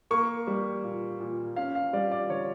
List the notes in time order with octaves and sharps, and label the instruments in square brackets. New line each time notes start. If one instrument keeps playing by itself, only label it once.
[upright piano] A#3 C#6
G3
A#2
A#2
C#4 F5
F5
G3 D5
D5
D3 C#5